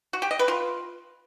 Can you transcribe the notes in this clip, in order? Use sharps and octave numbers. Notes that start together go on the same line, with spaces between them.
F#4
G4
D#5
B4
F4